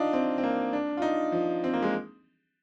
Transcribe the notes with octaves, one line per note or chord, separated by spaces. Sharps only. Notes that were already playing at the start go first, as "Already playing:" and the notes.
Already playing: D4 D#4 F4
C4
C4
A#3
D4
F4
D#4
F3
C4
A#3
G#3